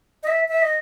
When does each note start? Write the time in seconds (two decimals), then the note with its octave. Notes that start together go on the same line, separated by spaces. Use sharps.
0.23 D#5
0.27 E5
0.48 E5
0.62 D#5